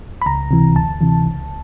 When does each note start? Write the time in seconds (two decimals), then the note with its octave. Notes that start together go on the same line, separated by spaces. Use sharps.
0.22 B5
0.26 C#2 A#5
0.51 C3 E3
0.75 D2 A5
1.01 C3 E3
1.26 C#2